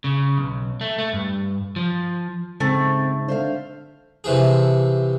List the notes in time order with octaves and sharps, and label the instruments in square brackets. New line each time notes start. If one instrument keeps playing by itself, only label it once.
[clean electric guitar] C#3
B1
A3
A3
G2
F3
[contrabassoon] G#2 [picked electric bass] C#3 [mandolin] A3 [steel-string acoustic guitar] C4
[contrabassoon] D3 [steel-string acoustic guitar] C5 E5 F5
[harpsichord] C3 E3 F3 G#4